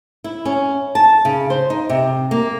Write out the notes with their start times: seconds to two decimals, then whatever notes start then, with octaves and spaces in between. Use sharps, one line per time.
0.24 E4
0.45 C#4
0.95 A5
1.25 C#3
1.50 C5
1.70 D#4
1.89 C3
2.31 A#3